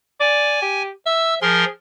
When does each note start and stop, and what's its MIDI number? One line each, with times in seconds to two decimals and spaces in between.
0.20 0.61 74
0.20 0.82 80
0.62 0.90 67
1.06 1.42 76
1.06 1.34 88
1.42 1.65 53
1.42 1.70 68
1.42 1.65 70
1.42 1.65 84